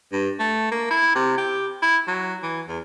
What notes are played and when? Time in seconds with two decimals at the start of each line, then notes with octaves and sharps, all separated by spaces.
0.12 G2
0.39 A3
0.71 A#3
0.91 E4
1.15 C3
1.37 G4
1.82 E4
2.07 F#3
2.43 E3
2.68 E2